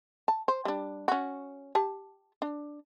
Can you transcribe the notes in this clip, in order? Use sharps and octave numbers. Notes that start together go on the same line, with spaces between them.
A5
C5
G3 D4
C#4 F#4
G4 A5
D4